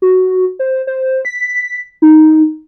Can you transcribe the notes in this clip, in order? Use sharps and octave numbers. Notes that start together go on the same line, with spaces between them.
F#4
C5
C5
B6
D#4